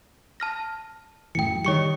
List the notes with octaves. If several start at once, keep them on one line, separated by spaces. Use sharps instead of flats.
A5 F6 A#6
F#2 A2 E3 G5 C#7
D#3 G3 C#5 C#6 C#7